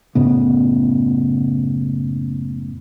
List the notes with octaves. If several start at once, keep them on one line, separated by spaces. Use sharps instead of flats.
F#1 A2 C#3 B3